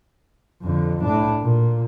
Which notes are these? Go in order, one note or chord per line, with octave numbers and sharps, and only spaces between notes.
F2 D3
A2 D4
A#2